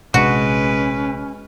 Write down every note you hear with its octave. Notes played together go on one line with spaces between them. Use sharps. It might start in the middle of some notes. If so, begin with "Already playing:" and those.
A#1 C3 G#3 C#4 D4 F#4 B4